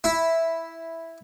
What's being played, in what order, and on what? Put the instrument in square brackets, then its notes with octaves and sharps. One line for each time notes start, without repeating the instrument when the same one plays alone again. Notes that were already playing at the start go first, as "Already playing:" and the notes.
[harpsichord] E4